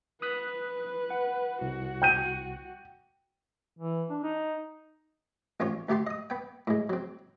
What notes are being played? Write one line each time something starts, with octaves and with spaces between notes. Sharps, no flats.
B4 D#6 F#6 B6
F#5
C2 F#4
G5 G6 D#7
E3
D4
D#4
A1 C4 C#4 F4 C#5
D2 A3 G4 A5 C6
D#5 D#6
B3 G5
A2 G#3
F#3 C4